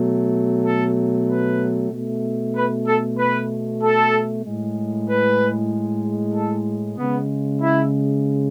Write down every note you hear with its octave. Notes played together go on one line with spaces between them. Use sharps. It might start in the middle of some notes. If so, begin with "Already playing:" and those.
Already playing: B2 F#3 A3
A4
B4
B2 A3
B4
A4
B4
A4
A2 G#3
B4
A4
C#3 G#3 B3
E4